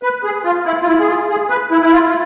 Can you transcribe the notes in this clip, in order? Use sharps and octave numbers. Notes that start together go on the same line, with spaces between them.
B4
G#4
F4
E4
F4
E4
G#4
F4
G#4
B4
E4
E4
F4
F4